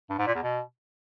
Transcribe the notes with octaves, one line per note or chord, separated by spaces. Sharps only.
G2
G#2
A#2
E2
B2